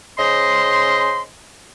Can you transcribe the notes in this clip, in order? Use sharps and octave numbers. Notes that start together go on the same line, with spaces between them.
C#3 C5 D#5 C6